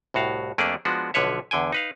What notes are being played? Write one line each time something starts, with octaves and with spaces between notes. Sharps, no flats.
C2 A2 F#4 F5
F2 A3 A#3 D4 G#4 D5
F3 G#3 B3 D4 F#4
B1 D3 F3 B4 C#5 E5
E2 D3 G5 G#5
D#4 B4 F5